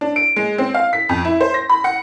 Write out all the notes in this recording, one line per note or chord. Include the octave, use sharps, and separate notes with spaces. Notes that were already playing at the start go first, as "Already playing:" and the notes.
D4
D7
G#3
C4
F5
B6
F2
E4
C5
A#6
B5
F#5